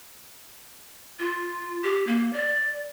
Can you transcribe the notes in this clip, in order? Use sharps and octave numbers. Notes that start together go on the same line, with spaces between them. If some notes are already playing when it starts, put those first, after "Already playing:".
F4
G4
A#3
D5